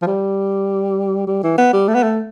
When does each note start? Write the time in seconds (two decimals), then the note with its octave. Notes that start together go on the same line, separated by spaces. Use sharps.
0.02 F3
0.07 G3
1.27 G3
1.43 E3
1.58 B3
1.73 G3
1.88 A3
1.95 B3
2.03 A3